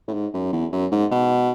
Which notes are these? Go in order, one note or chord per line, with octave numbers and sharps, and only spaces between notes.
A2
G#2
F#2
E2
F#2
G#2
B2